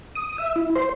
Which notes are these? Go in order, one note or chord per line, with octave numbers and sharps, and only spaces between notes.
D#6
E5
E4
C5